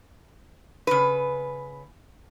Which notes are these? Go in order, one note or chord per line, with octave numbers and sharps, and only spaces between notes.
C#3 B4